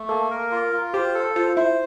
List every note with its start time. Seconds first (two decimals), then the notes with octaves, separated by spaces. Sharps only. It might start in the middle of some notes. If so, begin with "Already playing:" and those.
Already playing: A3
0.09 A#3 A4
0.31 A#4
0.52 F4
0.73 F4
0.93 G4 C5
1.15 A4
1.36 F4 C5
1.57 E4 C5